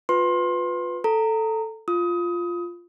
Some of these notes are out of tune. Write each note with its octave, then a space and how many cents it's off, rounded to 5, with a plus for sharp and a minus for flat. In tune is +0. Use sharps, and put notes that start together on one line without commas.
F4 +25 B4 +10 C6 +25
A4 +0 A#5 -20
F4 +0 D#6 +25